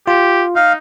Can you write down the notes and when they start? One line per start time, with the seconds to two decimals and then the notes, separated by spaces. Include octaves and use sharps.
0.07 F4 G4
0.56 D#4 F5